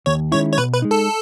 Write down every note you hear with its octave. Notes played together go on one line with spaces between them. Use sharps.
D#2 C#5
D#3 G#3 C#4 E4 C#5
C#5
B2 B4
B4
G#3 D#4
A4